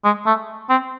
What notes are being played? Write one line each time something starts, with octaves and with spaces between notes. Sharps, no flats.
G#3
A3
C4